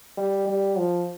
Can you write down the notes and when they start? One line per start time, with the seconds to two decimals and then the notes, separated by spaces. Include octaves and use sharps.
0.17 G3
0.47 G3
0.78 F3